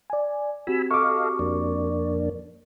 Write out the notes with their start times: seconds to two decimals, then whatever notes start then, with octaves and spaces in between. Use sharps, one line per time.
0.10 D5 G#5
0.67 C4 F#4 G4 G#5 B5 E6
0.91 A4 D#5 F5 C#6 D6
1.39 F2 A#3 D4